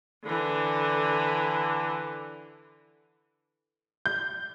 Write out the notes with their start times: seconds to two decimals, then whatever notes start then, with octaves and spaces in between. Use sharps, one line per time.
0.24 D3 E3
4.06 G6